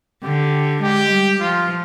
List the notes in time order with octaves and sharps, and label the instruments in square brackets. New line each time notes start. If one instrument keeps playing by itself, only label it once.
[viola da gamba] D3 [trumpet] G4
[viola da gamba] G#3 [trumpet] G4
[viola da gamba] G3
[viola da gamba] F3 [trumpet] F4